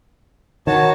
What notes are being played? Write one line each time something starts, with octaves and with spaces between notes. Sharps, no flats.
D#3 F#4 C#5 A5